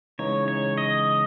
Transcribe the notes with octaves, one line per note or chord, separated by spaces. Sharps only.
C#3 E3 G#3 D#4 C#5
C#5
D#5